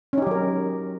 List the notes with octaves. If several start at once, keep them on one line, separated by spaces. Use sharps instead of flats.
F#3 C#4 D#4 G4 A#4